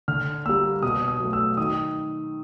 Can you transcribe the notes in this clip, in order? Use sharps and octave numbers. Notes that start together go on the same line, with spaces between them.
D3 F6
G3 A#3 E6
B2 D#6
D#6
F#3 A3
E6
D#3 D#6